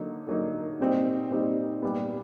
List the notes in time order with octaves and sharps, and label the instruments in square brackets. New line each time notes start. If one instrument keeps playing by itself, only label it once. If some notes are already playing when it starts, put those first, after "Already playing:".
Already playing: [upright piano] D3 F#3 A#3 D#4
D3 F#3 A#3 D#4
A#2 G3 C4 D#4
A#2 G3 C4 D#4
A#2 G3 B3